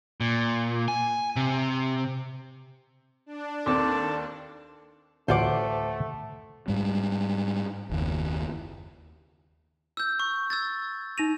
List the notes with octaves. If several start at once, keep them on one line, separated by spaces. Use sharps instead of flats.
A#2
G#5
C3
D4
D#2 C4 A4 D5 D6
A1 D2 A3 F4 C5 F#5 D6
G#2 G3
F#1 D#2
E6 G6
C#6
E6 G#6 A6
D#4 A#6 D#7 F7